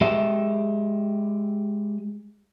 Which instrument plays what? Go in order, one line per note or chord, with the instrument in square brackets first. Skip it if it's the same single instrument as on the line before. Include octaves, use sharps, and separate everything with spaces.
[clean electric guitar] G#3 G4 E5